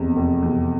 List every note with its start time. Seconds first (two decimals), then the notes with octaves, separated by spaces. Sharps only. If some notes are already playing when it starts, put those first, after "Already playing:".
Already playing: F1 E2 C3
0.16 F1
0.42 E2 C3